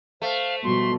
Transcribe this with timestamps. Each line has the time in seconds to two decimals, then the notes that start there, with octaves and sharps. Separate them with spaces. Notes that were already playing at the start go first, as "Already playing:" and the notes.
0.22 A3 C5 F5
0.64 B2 F3 G3 F#4 C6